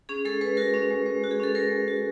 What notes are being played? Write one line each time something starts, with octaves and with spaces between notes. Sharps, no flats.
C#4 G#4
G#3 A4
G#3 B4
F#4 A#4
C#4
G#3
G#3
F#4
G#4
C#4 A4
G#3 A#4
G#3
F#4